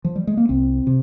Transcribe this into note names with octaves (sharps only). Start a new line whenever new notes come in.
F3
G3
G#3
A#3
C2 C4
C3